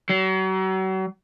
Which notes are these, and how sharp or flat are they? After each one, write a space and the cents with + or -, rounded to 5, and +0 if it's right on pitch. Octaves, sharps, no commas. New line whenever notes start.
F#3 +40